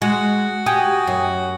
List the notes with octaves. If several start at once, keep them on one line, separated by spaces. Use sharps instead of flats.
G#3 F#4
G4 G5 G#5 D#6
F#2